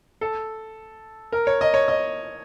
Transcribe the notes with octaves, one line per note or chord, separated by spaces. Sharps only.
A4
A#4
C#5
D#5
C#5
D#5